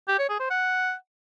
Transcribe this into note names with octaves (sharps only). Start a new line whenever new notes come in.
G4
C#5
G#4
C5
F#5